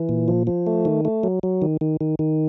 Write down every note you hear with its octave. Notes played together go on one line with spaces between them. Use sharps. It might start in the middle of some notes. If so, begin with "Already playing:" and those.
Already playing: E3
A#2
F3
F3
A3
D#3
A3
F#3
F#3
D#3
D#3
D#3
D#3